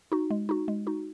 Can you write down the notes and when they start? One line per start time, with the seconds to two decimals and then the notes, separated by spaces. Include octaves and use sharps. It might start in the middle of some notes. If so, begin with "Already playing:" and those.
0.12 D#4 F#4
0.30 G#3
0.49 D#4 F#4
0.68 G#3
0.87 D#4 F#4